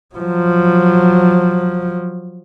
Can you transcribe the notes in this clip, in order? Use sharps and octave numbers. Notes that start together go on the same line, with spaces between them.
F3 F#3